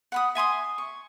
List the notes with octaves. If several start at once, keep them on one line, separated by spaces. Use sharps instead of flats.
F#5 B5 D#6
E5 G#5 C6 D#6
C#6